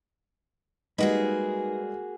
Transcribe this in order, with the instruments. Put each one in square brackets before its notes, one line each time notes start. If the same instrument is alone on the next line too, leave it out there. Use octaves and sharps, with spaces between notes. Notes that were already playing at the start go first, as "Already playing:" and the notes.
[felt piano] G3 G#3 [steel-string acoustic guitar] A#3 F#4 G#4 [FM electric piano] D#4 D#5 [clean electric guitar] B4